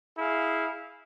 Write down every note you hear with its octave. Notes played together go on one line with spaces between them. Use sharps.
E4 G#4 F5